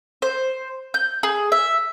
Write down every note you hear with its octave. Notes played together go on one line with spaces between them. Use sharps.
C5
G6
G#4
E5